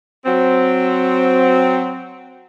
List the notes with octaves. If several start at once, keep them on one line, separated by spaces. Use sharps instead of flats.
F#3 C4